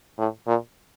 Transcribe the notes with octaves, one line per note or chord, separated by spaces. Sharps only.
A2
A#2